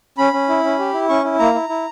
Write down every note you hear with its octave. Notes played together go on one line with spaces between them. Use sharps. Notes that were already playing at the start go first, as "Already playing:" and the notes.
C#4 B5
C#4
E4
C#4
G4
E4
C#4 C#6
E4
A#3 A#5
E4
E4